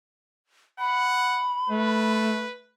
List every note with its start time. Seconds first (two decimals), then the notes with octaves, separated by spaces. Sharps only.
0.79 F#5 B5
1.70 A3 B4